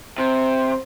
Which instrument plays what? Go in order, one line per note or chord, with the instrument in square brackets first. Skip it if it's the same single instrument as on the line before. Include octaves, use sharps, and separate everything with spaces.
[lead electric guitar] C3 [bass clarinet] C5